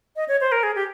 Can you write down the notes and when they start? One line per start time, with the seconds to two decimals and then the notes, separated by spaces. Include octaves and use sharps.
0.16 D#5
0.28 C#5
0.41 C5
0.52 A#4
0.63 G#4
0.75 G4